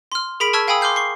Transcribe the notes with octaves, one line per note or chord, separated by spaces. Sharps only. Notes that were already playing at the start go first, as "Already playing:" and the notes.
C6 F6
G#4 A#4 B5 B6 D7 F7
A5 C#6 E6 F6 G#6 B6
F5 G5 G#5 B5 D#6 E6
C6 D6 F6 G6 C7
C#6 C7